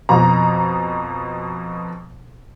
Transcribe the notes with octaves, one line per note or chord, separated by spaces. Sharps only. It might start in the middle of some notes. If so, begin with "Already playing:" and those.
F2 B2 A#5